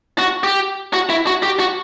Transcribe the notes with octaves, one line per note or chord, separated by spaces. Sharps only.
F#4
G4
F#4
E4
F#4
G4
F#4